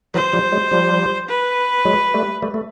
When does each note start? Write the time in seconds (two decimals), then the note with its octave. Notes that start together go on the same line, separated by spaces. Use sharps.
0.14 E3 F#3 C5
0.33 F3 G3
0.52 F#3 G#3
0.71 F3 G3
1.29 B4
1.85 F#3 G#3
2.14 G3 A3
2.42 G3 A3
2.54 A3